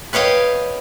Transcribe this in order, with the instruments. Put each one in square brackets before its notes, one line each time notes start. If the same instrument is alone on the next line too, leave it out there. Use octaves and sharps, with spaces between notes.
[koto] B4 C#5 D#5 F5 G5